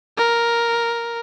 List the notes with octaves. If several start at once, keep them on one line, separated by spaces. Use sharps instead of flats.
A#4